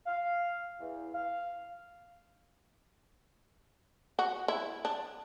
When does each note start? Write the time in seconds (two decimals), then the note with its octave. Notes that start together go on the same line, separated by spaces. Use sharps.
0.06 F5
0.79 E2
1.13 F5
4.19 F#4
4.48 E4
4.85 D4